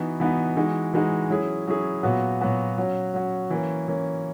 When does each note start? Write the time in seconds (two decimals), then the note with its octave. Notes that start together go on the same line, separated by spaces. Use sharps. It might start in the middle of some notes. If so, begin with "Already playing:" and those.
Already playing: E3 B3 D#4 F#4
0.20 E3 B3 D#4 F#4
0.56 E3 G#3 D#4 F#4
0.93 E3 G#3 D#4 F#4
1.30 F#3 C#4 E4 G#4
1.67 F#3 C#4 E4 G#4
2.03 A#2 F#3 B3 F#4
2.41 A#2 F#3 B3 F#4
2.78 F#3 C#4 F#4
3.14 F#3 C#4 F#4
3.50 E3 A#3 C#4
3.88 E3 A#3 C#4